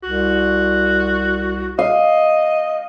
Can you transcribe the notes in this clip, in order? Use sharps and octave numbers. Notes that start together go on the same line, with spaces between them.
C2 F#4
D#5 F5